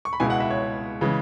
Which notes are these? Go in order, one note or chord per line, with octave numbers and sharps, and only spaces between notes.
C#6
B5
C#2 B2 G#3 E4 G#5
F#5
E5
C#5
C#3 E3 G#3